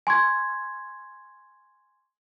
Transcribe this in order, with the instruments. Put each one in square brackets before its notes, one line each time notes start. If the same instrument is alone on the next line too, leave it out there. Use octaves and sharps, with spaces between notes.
[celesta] G#5 C6 C#6 G#6